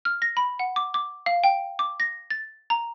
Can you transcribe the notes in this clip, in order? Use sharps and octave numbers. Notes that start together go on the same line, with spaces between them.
F6
A#6
B5
F#5
D6
D6
F5
G5
D6
A#6
A6
A#5